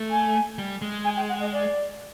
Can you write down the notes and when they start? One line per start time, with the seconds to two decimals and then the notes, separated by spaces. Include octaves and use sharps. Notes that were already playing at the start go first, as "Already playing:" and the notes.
Already playing: A3
0.11 G#5
0.58 G3
0.82 G#3
1.05 G#5
1.17 G5
1.29 F#5
1.41 D#5
1.52 D5